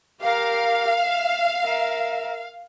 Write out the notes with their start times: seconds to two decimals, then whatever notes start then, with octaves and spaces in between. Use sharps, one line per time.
0.22 G4 A#4 F5
1.00 E5
1.63 A#4 E5